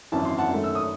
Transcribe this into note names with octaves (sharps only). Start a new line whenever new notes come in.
G#1 F#2 E3 A5
C6
F#5 A5
F#2 D#3 A3
E6
D#6